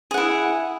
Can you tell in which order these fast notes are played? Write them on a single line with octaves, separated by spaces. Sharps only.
G#4 F#5 E4